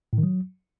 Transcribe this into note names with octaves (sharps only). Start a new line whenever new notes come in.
A2
D#3
F#3